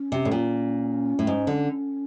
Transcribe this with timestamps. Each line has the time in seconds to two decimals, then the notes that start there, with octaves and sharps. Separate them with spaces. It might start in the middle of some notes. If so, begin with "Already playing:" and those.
Already playing: C#4
0.12 C3
0.25 A2
0.32 A#2
1.19 A2
1.27 G#2
1.47 D3